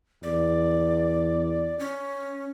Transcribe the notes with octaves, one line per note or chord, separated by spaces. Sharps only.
E2 D5
C#4